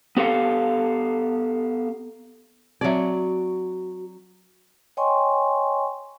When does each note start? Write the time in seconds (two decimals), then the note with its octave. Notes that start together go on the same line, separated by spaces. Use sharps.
0.17 B3 G4 A4 F5
2.81 F#3 C4 F#4 C#5 D5 E5
4.97 C#5 D#5 G5 G#5 C6 C#6